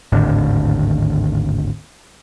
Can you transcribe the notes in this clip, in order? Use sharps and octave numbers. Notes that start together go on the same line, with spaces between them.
G#1 D#2 A2 D3